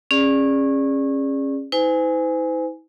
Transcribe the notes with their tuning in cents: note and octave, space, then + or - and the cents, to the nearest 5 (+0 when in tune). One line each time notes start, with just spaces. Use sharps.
C#4 -25 G#4 -15 D5 +0
E4 -45 C5 -45 G#5 +0